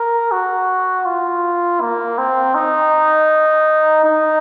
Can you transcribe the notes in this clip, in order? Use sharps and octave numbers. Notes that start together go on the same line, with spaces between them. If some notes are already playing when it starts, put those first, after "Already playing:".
Already playing: A#4
F#4
F4
A#3
C4
D#4
D#4